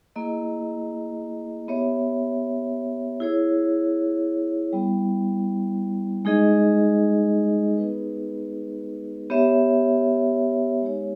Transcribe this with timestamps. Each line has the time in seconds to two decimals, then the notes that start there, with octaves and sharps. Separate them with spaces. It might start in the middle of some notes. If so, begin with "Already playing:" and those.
0.16 A#3 E4 G#4 D#5
1.68 B3 G4 C#5 E5
3.20 E4 G#4 C#5
4.73 G3 B3 E4
6.25 G#3 D#4 G#4 D#5
7.77 B3 D#4 G#4 B4
9.30 B3 G4 C#5 E5
10.82 G#3 D#4 G4 C#5